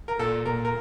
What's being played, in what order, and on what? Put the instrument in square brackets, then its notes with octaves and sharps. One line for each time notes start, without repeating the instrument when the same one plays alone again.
[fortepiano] A#4
[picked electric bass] A#2 [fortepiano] A4
[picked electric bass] A#2 [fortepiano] A#4
[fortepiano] A#4